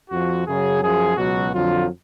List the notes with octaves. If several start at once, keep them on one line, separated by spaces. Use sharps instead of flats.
F2 F3 F#4
F#2 C#3 F#3 G#4
F#2 F3 G#4
C#2 B2 F#3 F#4
F2 D3 F#3 F4